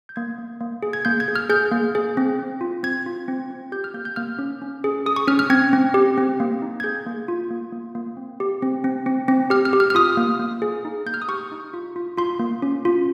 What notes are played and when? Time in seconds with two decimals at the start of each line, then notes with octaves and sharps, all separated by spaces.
0.09 G6
0.16 A#3 G#6
0.38 A#3
0.60 A#3
0.83 G#4
0.93 G#6
1.05 A#3 G6
1.20 G#6
1.28 G#4
1.36 F6
1.49 G#4 G6
1.72 A#3
1.95 G#4
2.17 C4
2.39 C4
2.61 F4
2.83 C4 G#6
3.06 F4
3.28 C4
3.50 C4
3.72 G4 G6
3.84 F6
3.94 A#3 G6
4.05 G6
4.16 A#3 F6
4.39 C#4
4.62 C#4
4.84 G#4
5.06 G#4 D#6
5.16 C#6
5.27 C#4 F6
5.39 F6
5.50 C4 G#6
5.73 C4
5.94 G4
6.18 C4
6.40 A#3
6.62 D#4
6.80 G#6
6.83 G#4 G6
7.06 A#3
7.28 F4
7.51 A#3
7.72 A#3
7.95 A#3
8.17 C4
8.40 G4
8.62 C4
8.84 C4
9.06 C4
9.28 C4
9.50 G4 F6
9.65 F6
9.73 G4
9.80 F6
9.90 F6
9.95 F4 D#6
10.17 A#3
10.40 A#3
10.62 G#4
10.85 D#4
11.06 A#3 G6
11.14 F6
11.22 D#6
11.28 G4 C#6
11.52 D#4
11.74 F4
11.96 F4
12.17 F4 C6
12.39 A#3
12.62 C#4
12.85 F4